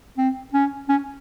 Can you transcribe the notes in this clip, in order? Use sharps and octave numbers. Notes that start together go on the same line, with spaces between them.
C4
C#4
C#4